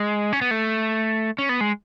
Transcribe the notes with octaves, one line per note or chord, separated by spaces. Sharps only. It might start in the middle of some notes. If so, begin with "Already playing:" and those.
Already playing: G#3
C#4
B3
A3
C#4
B3
G#3